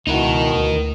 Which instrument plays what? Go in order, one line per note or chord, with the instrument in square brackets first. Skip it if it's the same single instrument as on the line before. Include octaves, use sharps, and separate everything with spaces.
[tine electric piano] C#2 E4 F#5 [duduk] B2 [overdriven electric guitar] D#4 A#4
[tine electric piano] D2